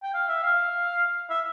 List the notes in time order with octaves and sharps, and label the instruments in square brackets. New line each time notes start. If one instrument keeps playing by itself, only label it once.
[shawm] G5
F5
E5
F5
E5